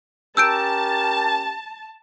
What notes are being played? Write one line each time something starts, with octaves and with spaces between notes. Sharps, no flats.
C#4 G4 A#4 A5 E6 G6 D7